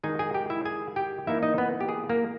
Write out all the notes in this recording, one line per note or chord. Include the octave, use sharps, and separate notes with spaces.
D#3 G#3 D#4 G#4 G#5
G#4 G#5
G4 G5
E4 E5
G#4 G#5
G4 G5
E3 A#3 D#4 E4 E5
D#4 D#5
B3 B4
G4
G#4
A#3 A#4